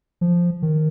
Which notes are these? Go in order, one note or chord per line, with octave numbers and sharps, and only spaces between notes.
F3
D#3